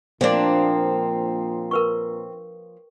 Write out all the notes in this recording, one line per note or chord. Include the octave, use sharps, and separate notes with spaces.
A#2 F3 A#3 C4 D4
A#4 B4 C#6